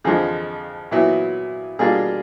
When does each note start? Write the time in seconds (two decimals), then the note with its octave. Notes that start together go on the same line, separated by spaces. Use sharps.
0.04 F2 D3 F3 G#3 G#4
0.91 A#2 F#3 B3 E4
1.79 B2 G3 A#3 D4 F4 G#4